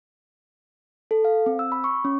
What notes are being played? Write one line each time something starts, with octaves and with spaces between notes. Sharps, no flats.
A4
F5
C4
E6
B5
C#6
C#4